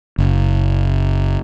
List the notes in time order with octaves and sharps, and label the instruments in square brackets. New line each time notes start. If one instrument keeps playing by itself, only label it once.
[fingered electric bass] F#1